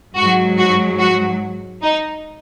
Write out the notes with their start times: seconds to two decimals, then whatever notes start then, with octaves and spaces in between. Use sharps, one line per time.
0.17 G#2 F#3 F#4
0.58 F#4
1.00 F#4
1.82 D#4